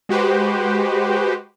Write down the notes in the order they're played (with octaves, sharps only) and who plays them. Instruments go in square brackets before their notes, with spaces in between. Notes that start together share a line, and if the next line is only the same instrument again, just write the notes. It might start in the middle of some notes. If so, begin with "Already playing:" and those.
[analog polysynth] G#3 F#4 G4 B4 C5